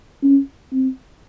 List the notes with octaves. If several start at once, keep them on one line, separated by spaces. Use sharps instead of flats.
C#4
C4